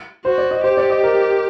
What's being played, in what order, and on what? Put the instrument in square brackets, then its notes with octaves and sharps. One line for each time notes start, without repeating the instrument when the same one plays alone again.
[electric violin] F#4 [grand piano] C5
[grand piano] D5
D#5
[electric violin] G4 [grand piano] C5
[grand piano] D5
D#5
A#4